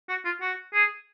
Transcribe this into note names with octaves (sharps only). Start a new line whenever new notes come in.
F#4
F4
F#4
G#4